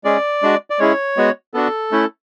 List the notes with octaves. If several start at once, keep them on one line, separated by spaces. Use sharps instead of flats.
G#3 C#4 G#4 D5
G#3 D4 F#4
D5
G#3 C#4 E4 G#4 C#5
G#3 B3 F#4
B3 D4 F#4 A4
A3 C#4 E4